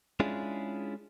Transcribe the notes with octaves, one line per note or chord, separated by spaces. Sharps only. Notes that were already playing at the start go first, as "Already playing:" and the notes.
G#3 C#4 D4 E4 F4 G#4